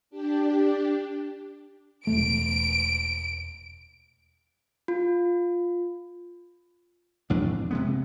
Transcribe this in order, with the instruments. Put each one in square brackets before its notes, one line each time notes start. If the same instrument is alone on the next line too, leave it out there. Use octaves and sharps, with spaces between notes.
[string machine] D4 G4
[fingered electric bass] E1 E2 A3 [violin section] D7
[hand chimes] F4
[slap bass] A1 F2 D4
C3 G#3 B3